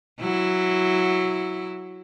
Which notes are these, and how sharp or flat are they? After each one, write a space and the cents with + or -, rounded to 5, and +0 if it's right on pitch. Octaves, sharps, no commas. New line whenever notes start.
F#3 +0 E4 +0